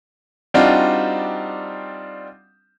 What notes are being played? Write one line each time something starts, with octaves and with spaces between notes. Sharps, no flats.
G3 C4 D4 D#4 F4 F#4